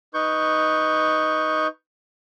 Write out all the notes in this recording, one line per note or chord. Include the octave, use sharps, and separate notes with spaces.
D#4 B4 C#6 G6